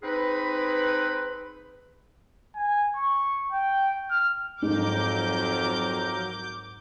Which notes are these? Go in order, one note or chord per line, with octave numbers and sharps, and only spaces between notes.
C4 D#4 G#4 B4
G#5
C#6
G5
F6
F2 G#2 F#3 A#4 D6 G6